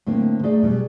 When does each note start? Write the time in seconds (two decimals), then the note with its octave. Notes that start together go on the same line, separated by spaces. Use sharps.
0.06 A2 D3 A#3 C4
0.43 A3 D#4 G#4 D5 E5
0.63 B2 G3 G#4